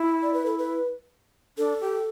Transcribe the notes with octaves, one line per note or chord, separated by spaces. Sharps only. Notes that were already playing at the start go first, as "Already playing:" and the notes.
Already playing: E4
D5
B4
A4
B4
D4 A4
G4